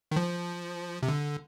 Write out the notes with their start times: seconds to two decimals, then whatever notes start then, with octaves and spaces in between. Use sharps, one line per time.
0.11 D#3
0.16 F3
1.03 C3
1.09 D3